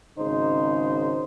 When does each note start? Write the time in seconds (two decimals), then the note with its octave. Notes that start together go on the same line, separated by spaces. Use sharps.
0.17 G#1 C#3 D#4 C5